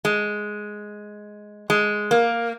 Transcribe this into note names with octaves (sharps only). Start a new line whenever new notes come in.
G#3
G#3
A#3